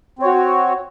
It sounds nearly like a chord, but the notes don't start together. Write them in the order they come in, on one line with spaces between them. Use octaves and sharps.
C4 C#5 F#4